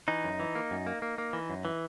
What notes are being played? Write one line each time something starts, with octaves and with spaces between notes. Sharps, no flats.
E3 D#4
F#2
E3
A#3
F#2
A#3
A#3
A#3
E3
F#2
E3